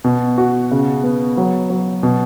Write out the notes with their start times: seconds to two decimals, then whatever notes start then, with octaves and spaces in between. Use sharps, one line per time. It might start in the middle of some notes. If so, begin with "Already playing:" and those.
0.04 B2
0.38 F#4
0.71 C#3
1.04 B3
1.37 F#3
1.70 F#3
2.03 B2